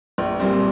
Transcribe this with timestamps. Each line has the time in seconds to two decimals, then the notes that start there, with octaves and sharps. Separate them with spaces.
0.18 A#1
0.40 A#2 G3 C4